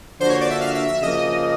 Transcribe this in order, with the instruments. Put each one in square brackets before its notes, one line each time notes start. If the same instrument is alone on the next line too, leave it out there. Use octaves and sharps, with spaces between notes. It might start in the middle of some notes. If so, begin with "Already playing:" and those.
[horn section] D3 F3 A#3 D4 F#4 [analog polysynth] C5
[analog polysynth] C#5
D5
E5
F5
E5
E5
[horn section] C#3 F3 A#3 [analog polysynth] D#5